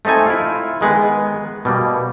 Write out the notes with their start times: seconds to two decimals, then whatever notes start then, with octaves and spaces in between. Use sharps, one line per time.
0.05 A3 C4 D#4 A4 G#5
0.26 E4 F4
0.81 D#3 G#3 B3
1.65 B2 G3 A#3